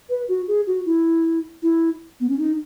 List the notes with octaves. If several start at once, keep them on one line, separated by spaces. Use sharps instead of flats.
B4
F#4
G#4
F#4
E4
E4
B3
C#4
D#4